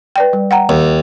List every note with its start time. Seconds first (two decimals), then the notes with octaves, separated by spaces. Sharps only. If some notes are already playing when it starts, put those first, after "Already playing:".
0.16 B4 D5 G5
0.33 G3
0.51 F#5 G5 A#5
0.69 D#2